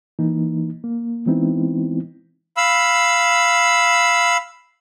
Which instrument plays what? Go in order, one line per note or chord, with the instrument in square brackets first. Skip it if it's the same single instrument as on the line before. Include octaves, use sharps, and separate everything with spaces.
[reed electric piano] E3 A#3 D#4
A#3
E3 G#3 B3 C4 D#4 E4
[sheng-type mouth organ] F5 B5 E6